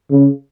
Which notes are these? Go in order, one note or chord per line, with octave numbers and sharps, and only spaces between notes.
C#3